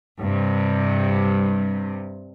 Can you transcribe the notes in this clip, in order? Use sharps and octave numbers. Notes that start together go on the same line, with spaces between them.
G2 C3